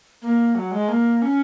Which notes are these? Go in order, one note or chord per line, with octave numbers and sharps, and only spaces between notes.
A#3
F#3
G#3
A#3
C#4